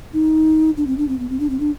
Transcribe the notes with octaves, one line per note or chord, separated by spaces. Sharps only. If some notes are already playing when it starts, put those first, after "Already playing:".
D#4
D4
C4
D4
C4
B3
C4
D4
C4
D4